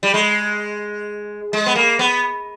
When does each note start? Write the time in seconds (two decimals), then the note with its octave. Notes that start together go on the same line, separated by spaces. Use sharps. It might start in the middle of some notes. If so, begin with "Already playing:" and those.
0.03 G3
0.14 G#3
1.53 G#3
1.66 B3
1.75 A#3
1.99 B3